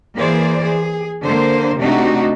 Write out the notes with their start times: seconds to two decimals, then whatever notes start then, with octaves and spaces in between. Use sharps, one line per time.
0.16 E3 A#3 G#4 C5 D5
0.64 G#4
1.24 D3 A#3 C5
1.80 C3 A3 D4 D#4 F#4